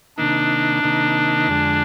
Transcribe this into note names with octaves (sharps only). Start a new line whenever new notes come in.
C3 D#3 A#3 D4 D#4
C3 D#3 A#3 D#4
F2 D3 G#3